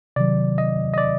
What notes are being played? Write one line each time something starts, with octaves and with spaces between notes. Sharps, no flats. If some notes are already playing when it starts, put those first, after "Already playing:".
C3 D#3 F#3 D5
D#5
D#5
D5